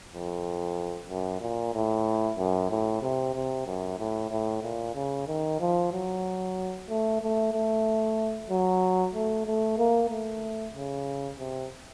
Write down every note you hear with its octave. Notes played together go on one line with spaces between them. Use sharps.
F2
F#2
A#2
A2
F#2
A2
C3
C3
F#2
A2
A2
A#2
C#3
D#3
F3
F#3
A3
A3
A3
F#3
A3
A3
A#3
A3
C#3
C3